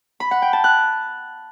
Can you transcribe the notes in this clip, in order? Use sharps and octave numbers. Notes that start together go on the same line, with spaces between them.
B5
F#5
G5
A5
F#6